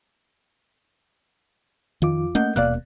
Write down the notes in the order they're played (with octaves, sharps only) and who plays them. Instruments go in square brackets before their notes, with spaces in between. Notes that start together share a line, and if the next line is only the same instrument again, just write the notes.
[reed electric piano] F2 F4 D6 [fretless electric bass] D#3
[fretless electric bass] A3 A#3 C#4 [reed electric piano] D#5 F#5 G6
[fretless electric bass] D#1 B2 A#3 [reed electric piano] D5 F5 F#6